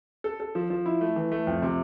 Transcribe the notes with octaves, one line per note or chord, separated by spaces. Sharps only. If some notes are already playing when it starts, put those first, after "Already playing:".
A4
A4
F3
F3
E4
A3
E3
A3
F2
C3